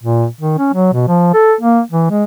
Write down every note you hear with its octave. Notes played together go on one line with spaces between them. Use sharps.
A#2
D#3
C#4
F#3
B2
F3
A4
A#3
E3
G#3